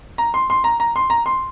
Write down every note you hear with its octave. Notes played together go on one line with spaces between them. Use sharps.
A#5
C6
C6
A#5
A#5
C6
A#5
C6